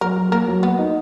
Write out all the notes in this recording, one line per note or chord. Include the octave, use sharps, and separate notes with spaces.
F#3 A#4
F#3
A#3 A#4
F#3
A#3 B3
D#4